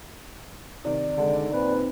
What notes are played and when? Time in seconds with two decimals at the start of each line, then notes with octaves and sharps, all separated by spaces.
0.85 C3 D#3 D5
1.17 D3 G#3
1.52 A#2 C4 B4